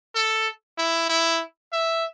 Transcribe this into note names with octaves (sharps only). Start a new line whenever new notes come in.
A4
E4
E4
E5